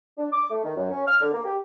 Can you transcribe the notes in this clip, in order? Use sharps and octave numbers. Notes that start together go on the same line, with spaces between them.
D4
D6
A3
D#3
F#2
C#4
F6
D3
A#3
G4